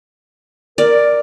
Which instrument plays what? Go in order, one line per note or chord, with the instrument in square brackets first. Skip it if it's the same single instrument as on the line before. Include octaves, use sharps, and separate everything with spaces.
[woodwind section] A#4 [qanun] D5